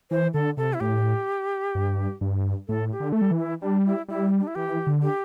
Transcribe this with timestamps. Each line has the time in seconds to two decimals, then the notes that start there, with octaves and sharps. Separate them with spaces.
0.11 E3 C5
0.34 D3 A4
0.57 C3 A4
0.74 E4
0.81 A2 G4
1.75 G2
2.21 G2
2.68 A2 A4
2.92 G4
3.00 D3
3.12 A3 A4
3.21 G3
3.31 E3
3.38 E4
3.61 G3 D4
3.86 E4
4.08 G3 E4
4.40 D4
4.47 E4
4.55 E3 G4
4.87 D3
5.02 G4